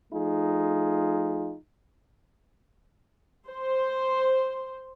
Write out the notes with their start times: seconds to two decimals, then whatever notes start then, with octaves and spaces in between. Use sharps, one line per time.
0.13 F3 A3 D#4 F4 G#4
3.49 C5